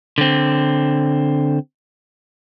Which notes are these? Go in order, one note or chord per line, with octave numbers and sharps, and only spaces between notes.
D3 C4